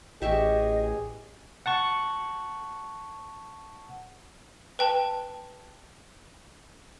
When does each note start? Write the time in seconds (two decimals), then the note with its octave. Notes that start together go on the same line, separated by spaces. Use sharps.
0.22 A1 G4 G#4 D#5 E5 C#6
1.66 F#5 A5 C#6
4.79 B4 G5 A5